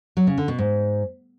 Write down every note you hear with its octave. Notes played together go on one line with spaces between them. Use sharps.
F#3
C#3
D3
B2
G#2